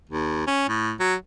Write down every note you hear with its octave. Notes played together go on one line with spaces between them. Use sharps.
D#2
C#4
A2
F#3